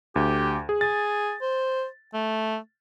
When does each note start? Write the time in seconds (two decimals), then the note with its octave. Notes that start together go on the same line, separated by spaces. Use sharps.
0.16 D2 G4
0.69 G#4
0.81 G#4 A6
1.41 C5
2.14 A3